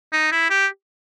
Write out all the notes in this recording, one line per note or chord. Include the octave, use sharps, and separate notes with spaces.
D#4
E4
G4